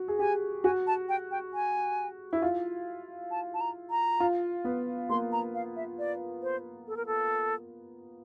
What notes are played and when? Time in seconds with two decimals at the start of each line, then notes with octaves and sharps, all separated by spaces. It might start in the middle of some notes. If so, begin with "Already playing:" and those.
Already playing: F#4
0.08 G#4
0.19 G4 G#5
0.64 F#4 G#5
0.87 A5
1.09 G5
1.31 G5
1.54 G#5
2.33 E4
2.42 F4
3.31 A5
3.54 A5
3.61 A#5
3.91 A#5
4.20 F4
4.65 B3
5.09 A#3 C6
5.32 A#5
5.55 F5
5.76 E5
5.99 D5
6.43 C5
6.88 A4
6.97 A#4
7.06 A4